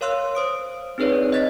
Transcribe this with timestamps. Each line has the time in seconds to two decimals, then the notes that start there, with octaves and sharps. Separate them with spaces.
0.01 A#4 C#5 F5 C6 E6 F#6
0.35 C5 D#6 D7
0.98 C4 D#4 G#4 B4 C#5 D5
1.32 D#5 F#6 A6 B6